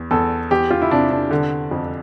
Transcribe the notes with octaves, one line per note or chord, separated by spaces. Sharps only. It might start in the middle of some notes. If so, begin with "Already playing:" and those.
Already playing: E2
E2 A4
E2 G4
F4
E4
C3 D4
D4
D3
F2